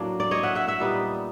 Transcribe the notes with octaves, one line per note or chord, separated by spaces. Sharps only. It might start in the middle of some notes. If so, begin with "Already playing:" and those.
Already playing: A2 F#3 A#3 D4
D5
C#5 D#5
E5 F#5
E5 F#5
E5 F#5
A#2 G3 B3 D#4